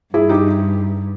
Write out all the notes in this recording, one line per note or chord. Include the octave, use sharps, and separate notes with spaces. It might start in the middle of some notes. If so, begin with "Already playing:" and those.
G2 E4 G#4
D#4 G4